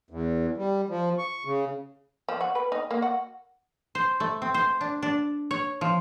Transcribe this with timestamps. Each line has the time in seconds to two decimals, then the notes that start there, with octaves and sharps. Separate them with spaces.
0.11 E2
0.57 G3
0.90 F3
1.18 C#6
1.45 C#3
2.29 F3
2.41 F#4
2.55 B4
2.72 D#4
2.91 A#3
3.02 F#4
3.95 C5
4.20 A3
4.42 C4
4.54 C5
4.81 D4
5.03 D4
5.51 C#5
5.81 F3